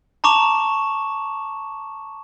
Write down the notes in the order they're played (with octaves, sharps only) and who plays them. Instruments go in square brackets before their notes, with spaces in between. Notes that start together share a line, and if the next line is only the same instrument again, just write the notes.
[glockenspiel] A5 A#5 C#6 D6 E7 F7